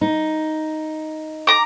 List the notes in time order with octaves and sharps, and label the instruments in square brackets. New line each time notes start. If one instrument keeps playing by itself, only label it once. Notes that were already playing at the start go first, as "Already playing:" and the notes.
[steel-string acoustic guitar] D#4
[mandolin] A#5 D6